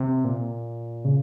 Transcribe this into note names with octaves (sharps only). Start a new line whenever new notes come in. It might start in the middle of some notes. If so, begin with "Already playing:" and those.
Already playing: C3
A#2
C#3